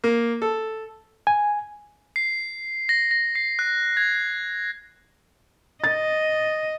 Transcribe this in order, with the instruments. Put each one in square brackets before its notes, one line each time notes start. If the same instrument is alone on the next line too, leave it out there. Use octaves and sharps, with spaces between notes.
[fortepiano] A#3
A4
[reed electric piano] G#5
[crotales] C7
A#6
A#6
C7
F#6
G#6
[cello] D#5 [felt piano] A6